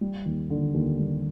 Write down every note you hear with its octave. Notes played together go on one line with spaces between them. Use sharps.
G3
D#2
D3
D#2
G3